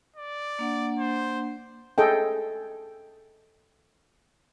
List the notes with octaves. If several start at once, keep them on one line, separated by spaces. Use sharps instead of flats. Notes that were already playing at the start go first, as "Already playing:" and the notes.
D5
A#3 D4 F#5
C5
G#4 A4 D#5 G5